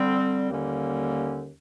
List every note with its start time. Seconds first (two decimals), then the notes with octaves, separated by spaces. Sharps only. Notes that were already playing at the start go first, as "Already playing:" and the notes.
Already playing: D3 G3 C4
0.49 D#2 D3 G3 A#3 C#4